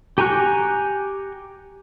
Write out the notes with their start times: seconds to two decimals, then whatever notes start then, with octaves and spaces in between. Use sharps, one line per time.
0.18 G4 G#5 A#5 C#6 F#6